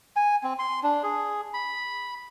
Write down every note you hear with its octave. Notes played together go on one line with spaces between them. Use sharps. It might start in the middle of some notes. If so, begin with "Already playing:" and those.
G#5
C4
C6
D4
G#4
B5